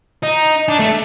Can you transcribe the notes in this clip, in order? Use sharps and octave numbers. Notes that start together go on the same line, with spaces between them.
D#4
D4
A3